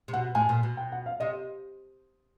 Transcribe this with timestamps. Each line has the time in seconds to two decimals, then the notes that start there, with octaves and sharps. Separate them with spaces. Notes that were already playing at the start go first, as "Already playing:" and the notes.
0.08 C3
0.13 B2 F#5
0.35 A2 G#5
0.49 A#2
0.63 B2
0.77 G5
0.92 F#5
1.06 F5
1.20 C3 D#5